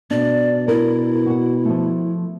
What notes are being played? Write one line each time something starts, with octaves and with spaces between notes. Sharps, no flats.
B2 D4 D5
E4 A#4
F#4 F#5
F3 A3